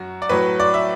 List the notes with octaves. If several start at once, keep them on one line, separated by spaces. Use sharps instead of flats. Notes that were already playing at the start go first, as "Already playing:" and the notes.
Already playing: F#2 F#4
D5
A2 F#3 B4
D5
E5